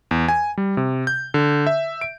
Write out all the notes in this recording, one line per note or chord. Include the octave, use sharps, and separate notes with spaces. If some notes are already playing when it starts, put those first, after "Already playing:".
E2
G#5
G3
C3
G6
D3
E5
D7